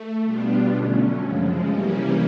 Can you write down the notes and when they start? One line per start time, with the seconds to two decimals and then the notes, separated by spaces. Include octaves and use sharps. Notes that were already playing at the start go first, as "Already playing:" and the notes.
Already playing: A3
0.23 B2 G3 B3 D4 F4
0.71 D3 F#3 A3 C#4
1.19 F#2 C#3 F3 G#3
1.67 C3 E3 G3 A#3 C#4